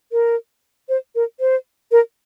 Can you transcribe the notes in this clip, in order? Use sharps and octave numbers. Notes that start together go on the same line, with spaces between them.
A#4
C5
A#4
C5
A#4